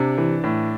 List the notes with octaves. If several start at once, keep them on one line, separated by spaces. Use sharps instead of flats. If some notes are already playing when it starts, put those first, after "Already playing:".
Already playing: C3 D4 D5
E3
A2